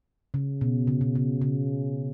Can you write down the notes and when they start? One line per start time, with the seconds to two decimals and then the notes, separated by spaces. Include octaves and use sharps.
0.34 C#3
0.61 B2
0.87 C#3
1.01 B2
1.15 C#3
1.42 C#3